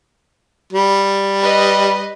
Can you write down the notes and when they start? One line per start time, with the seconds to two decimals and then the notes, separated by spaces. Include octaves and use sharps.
0.73 G3
1.41 B4 D#5